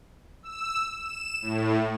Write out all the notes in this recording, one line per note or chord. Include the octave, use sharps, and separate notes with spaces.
E6
E7
A2